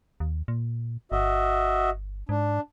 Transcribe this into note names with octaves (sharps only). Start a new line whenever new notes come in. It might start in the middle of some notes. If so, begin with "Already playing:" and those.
D#2
A#2
G1 F#4 D#5 E5
G#2 D4